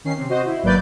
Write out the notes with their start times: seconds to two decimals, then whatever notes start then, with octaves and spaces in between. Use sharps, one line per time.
0.04 D#3 C#4 C7
0.16 C3
0.29 F#4 C5 D#5
0.46 E4
0.63 G#1 F#3 A#3 B4 D5 G6